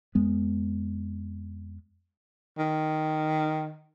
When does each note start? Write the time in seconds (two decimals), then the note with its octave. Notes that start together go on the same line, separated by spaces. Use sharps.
0.15 F2 G#3 B3
2.58 D#3